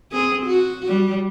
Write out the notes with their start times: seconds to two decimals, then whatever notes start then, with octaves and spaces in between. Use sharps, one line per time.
0.12 C4 G#4
0.46 F#4
0.87 G3